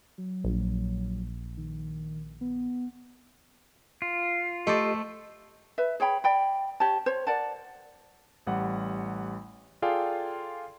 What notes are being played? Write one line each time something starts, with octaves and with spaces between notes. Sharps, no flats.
F#3
A#1
D#3
B3
F4
A3 G4 A4 C5 D5 D#5
B4 E5
G#4 C#5 G5 B5
D5 G5 B5
G4 C#5 A5
C5 C#5
A#4 D5 F#5 A5
A1 G3 F#5
F4 G#4 A4 D5 F5 G5